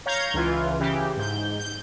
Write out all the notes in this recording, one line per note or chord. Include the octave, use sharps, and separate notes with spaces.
C#5 F5 A#5 G6 G#6
C#2 E3 F4
C#3 E3 G4
G#2 G6
G6